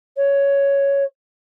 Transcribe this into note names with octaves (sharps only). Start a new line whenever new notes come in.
C#5